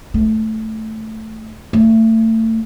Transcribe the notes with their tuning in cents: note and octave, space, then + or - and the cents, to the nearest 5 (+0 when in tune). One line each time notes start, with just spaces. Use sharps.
A3 -5
A3 +30